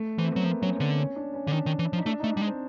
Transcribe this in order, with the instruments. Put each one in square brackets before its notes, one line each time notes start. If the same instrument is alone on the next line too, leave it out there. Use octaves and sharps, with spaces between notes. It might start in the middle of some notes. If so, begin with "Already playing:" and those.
Already playing: [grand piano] A3
[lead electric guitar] E3 [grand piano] C4
[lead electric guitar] F#3 [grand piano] B3
[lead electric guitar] F3 [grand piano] A#3
[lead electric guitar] F#3 [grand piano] C#4
[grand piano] C4
[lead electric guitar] D3
[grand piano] C#4
D4
C#4
[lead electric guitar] D3
[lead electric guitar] D#3 [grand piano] D4
[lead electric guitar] D#3
E3
F3
[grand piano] D#4
[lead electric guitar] A3 [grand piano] D4
[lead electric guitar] A3 [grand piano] D#4
[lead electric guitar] G3 [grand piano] D4
[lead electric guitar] G#3
[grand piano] C4